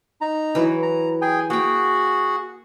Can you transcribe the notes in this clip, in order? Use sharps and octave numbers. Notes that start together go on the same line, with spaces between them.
D#4 A#5
E3 F#3
A#5
G#4 G5 G#5
A#3 F#4 G#4 F#5 G5